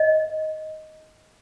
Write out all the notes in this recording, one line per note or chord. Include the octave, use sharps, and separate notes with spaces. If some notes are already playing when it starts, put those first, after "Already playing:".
Already playing: D#5